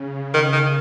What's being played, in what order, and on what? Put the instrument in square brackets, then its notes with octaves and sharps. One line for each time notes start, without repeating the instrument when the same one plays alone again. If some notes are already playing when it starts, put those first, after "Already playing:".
Already playing: [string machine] C#3
[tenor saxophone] D#3
D#3